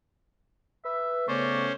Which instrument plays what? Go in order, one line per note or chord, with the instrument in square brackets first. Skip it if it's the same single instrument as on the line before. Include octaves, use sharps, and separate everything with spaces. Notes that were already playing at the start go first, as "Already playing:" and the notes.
[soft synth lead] B4 [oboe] E5
[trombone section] C#3 A3 B3 [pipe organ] C#4 C5 [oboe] D5 [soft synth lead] C#6